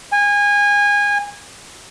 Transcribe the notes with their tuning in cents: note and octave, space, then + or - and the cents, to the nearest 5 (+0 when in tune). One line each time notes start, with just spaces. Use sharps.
G#5 -25